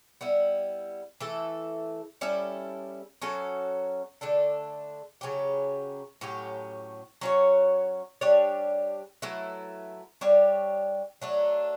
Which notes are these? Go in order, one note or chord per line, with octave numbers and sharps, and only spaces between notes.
G3 B3 E4
E3 A3 E4 A4
G3 C#4 E4 A4
F#3 C#4 F#4 A4
D3 A3 D4 A4
C#3 F#3 C#4 G4
A2 F#3 C#4 G4
F#3 C#4 F#4 C#5
G3 D4 G4 C#5
F#3 A3 E4 B4
G3 D4 G4 C#5
F#3 A3 D4